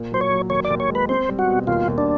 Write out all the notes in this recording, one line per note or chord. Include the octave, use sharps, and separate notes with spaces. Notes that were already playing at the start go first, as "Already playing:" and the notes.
Already playing: A#2
F#3 C5
C#5
F#3
D#2 C#5
D5
D#2
C#5
G#3
B4
C4 C5
G3
F#4
B2
D#2 F4
D#2
D4